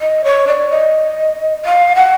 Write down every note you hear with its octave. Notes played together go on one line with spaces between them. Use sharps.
D#5
C#5
D5
D#5
F5
F#5